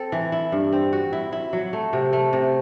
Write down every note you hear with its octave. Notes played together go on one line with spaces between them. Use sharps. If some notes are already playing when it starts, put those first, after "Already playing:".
Already playing: C4 A4
E3
E4
G2
C4
F#4
E4
E4
F#3
A3
C3
A3
C3